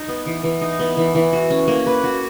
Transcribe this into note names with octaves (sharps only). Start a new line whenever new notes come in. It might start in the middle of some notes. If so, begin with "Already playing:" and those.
Already playing: D#4
B3
E3
E3
D#4
B3
E3
E3
F#4
C#4
A#3
B4
F#4